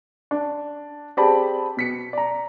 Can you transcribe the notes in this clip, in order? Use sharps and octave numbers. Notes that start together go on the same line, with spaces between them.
D4
C4 G4 G#4 D5 A5 B5
B2 B6 C#7
D5 A#5